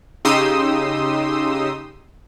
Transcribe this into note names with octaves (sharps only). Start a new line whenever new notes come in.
C#3 D#4 G4 C6 D#6 E6